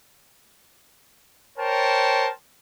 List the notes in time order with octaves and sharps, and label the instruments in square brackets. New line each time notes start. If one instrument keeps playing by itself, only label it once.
[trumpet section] A#4 C5 C#5 G5 A5